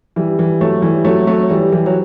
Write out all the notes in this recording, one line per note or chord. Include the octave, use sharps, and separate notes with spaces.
E3 G3
E3 G3
F#3 A3
E3 G3
F#3 A3
F#3 A3
E3 G3
E3 G3
F#3